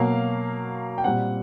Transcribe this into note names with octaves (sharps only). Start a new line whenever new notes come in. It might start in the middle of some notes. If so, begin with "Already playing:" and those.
Already playing: B2 F#3 A#3 F5
G5
A#2 G3 C4 F#5